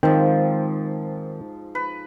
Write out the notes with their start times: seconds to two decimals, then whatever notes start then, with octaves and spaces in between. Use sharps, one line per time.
0.03 G#2 D#3 F3 C4 G5
1.75 B4